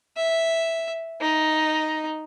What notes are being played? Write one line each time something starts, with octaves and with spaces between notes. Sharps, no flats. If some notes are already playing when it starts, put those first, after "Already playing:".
E5
D#4